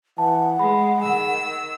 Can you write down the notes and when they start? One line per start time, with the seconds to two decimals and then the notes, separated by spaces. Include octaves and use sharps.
0.18 E3 F#5 A5
0.59 G#3 G#4 B5
1.03 D#3 E6